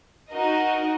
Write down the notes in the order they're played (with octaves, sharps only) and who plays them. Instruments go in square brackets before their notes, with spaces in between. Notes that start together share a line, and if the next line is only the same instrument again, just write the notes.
[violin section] D#4 F#4 A#4 D#5